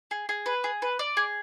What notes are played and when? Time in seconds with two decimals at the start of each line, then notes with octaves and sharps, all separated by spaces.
0.11 G#4
0.29 G#4
0.46 B4
0.64 G#4
0.82 B4
0.99 D5
1.17 G#4